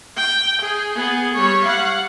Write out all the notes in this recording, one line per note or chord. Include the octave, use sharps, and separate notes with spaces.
G5
G#4
B3 G#4
G3 C#5
F5 F#5